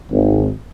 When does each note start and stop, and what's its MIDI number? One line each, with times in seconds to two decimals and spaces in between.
0.10 0.47 32